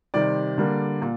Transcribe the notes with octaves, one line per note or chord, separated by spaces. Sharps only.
C3 D#3 G3 C4 D5
D3 G3 A#3
A#2